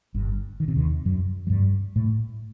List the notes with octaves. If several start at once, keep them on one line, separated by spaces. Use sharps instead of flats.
G1 G2
D#3
C3
D#2 D#3
F#2 F#3
F#3
G2 G3
A2 A3